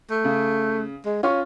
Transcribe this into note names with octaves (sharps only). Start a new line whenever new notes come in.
A3
C#3
G#3
C#4 F4 C#6